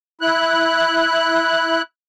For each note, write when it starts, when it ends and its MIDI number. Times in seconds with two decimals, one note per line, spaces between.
0.21 1.82 64
0.21 1.82 90